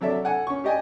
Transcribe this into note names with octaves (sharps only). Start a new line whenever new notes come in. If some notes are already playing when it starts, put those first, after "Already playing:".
C3 F#3 A4 D5 E5
A4 F#5 G#5
C#4 C#6
G4 D5 D#5 G5 G#5